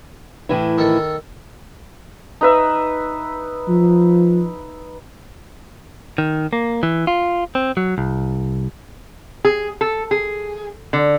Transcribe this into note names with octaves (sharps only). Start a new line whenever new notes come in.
A2 E3 E4
D#3 A4
D#4 B4 E5
F3
D#3
A#3
E3
F4
C4
F#3
C2
G#4
A4
G#4
D3